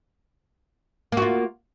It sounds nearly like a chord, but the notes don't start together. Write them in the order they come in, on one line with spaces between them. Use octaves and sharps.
A#3 F#4 F4